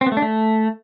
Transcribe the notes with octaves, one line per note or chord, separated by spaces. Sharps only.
C4
B3
A3
D4
A3